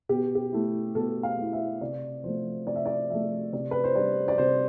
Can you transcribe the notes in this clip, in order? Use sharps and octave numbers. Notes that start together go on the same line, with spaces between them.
B2 G4
G4
A3 E4
B2 A4
F5
A3 E4
E5
C3 D5
F3 A3 C5
C3 D5
E5
D5
F3 A3 E5
C3 D5
B4
C5
G3 D4 D5
D5
C3 C5